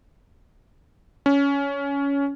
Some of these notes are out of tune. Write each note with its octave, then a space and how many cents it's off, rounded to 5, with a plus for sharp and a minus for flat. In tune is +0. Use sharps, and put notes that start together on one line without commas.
C#4 +15